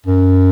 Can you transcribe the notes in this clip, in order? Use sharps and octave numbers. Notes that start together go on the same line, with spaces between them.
F#2